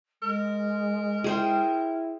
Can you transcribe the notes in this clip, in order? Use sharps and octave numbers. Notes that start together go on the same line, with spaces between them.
G#3 A#4
E4 G#4 C5 G5